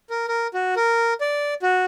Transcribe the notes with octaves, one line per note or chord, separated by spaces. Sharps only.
A#4
A#4
F#4
A#4
D5
F#4